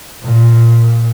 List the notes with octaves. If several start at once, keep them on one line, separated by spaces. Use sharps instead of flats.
A#2